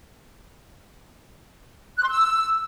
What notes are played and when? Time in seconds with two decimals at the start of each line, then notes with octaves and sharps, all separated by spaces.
1.97 F#6
2.03 C6
2.09 E6